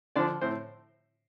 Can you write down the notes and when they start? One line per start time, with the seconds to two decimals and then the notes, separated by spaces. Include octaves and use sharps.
0.16 D3 F3 D4 D5
0.41 A2 C4 C5